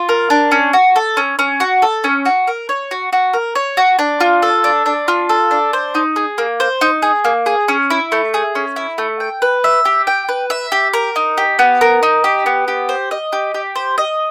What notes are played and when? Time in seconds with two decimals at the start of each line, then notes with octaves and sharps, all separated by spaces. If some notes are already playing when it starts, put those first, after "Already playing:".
Already playing: F4
0.09 A#4
0.30 D4
0.51 C#4
0.73 F#4
0.96 A4
1.17 C#4
1.39 C#4
1.60 F#4
1.82 A4
2.04 C#4
2.25 F#4
2.47 A#4
2.69 C#5
2.91 F#4
3.13 F#4
3.33 A#4
3.55 C#5
3.77 F#4
3.99 D4
4.20 F4
4.42 A4
4.64 D4
4.86 D4
5.08 F4
5.29 A4
5.51 D4
5.73 C5
5.95 D#4
6.16 G#4
6.38 A#3
6.60 C5
6.81 D#4
7.02 G#4
7.25 A#3
7.46 G#4
7.68 C#4
7.90 E4
8.12 A3
8.34 G#4
8.55 C#4
8.76 E4
8.98 A3
9.20 G5
9.42 B4
9.64 E5
9.85 G4
10.07 G5
10.29 B4
10.50 E5
10.72 G4
10.94 A#4
11.16 D#4
11.37 G4
11.59 B3
11.81 A#4
12.03 D#4
12.24 G4
12.46 B3
12.68 G4
12.89 C5
13.11 D#5
13.32 G4
13.54 G4
13.75 C5
13.98 D#5